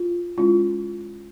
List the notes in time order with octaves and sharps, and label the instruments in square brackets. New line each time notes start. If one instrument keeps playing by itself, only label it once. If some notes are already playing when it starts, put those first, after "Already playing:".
Already playing: [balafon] F4
G#3 C#4 E4 F4